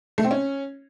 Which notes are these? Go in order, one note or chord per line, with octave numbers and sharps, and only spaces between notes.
A3
C4
C#4